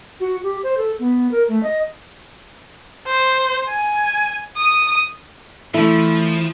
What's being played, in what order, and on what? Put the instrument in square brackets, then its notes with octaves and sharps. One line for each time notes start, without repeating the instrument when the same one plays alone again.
[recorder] F#4
G4
C5
A4
B3
A#4
A3
D#5
[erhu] C5
G#5
D#6
[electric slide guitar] E3 [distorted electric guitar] F3 [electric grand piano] A3 A4 [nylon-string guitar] E4